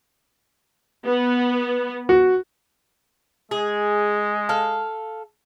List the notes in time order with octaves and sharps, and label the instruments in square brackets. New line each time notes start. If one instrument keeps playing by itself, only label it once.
[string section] B3
[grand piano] F#4
[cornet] G#3 [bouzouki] G#4
[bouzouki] A4 F5